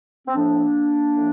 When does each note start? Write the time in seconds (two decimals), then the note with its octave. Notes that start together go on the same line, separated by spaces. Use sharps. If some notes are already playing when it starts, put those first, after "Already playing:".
0.28 C4
0.36 A2 F3 A#3 D4
1.15 A2 F3